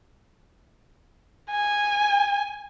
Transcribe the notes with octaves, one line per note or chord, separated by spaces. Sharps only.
G#5